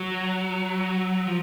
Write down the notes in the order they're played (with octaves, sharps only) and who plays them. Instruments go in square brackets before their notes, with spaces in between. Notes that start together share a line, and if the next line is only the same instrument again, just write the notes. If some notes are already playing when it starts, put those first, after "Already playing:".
Already playing: [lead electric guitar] F#3
F3